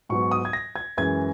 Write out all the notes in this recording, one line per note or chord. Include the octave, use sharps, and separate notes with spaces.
G#2 F#3 B3 C#6
D#6
G#6
A#6
G#6
F#2 E3 G#3 G#6